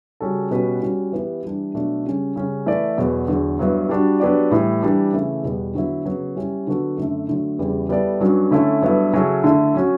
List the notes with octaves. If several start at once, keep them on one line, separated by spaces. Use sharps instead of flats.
C#3 G3 C#4 F#4 A4
B2 G3 C#4 F#4 B4
G3 C#4 F#4
E3 B3 E4 G4
E3 G3 D4
B2 F#3 A3 D4 A4
C#3 G3 C#4
C#3 G3 C#4
E3 A3 E4 B4 D5
E2 B2 F#3 B3
E2 D3 F#3
G2 F#3 B3 E4
G3 D4 F#4
F#3 B3 D4 G4 D5
A2 E3 G3
E3 G3 D4
C#3 E3 A3
E2 B2 G3 B3
D3 F#3 B3 E4
C#3 F#3 B3
G3 C#4 E4 G4
D3 F#3 B3 F#4 A4
F#2 D3 A3
D3 F#3 A3
E2 C#3 E3 G3
G3 B3 E4 A4 D5
G2 F#3 C#4 F#4
D3 A3 C#4 E4 A4
G2 F#3 B3 E4 A4
C#3 F#3 C#4 E4 A4
D3 A3 E4 A4
F#3 C#4 F#4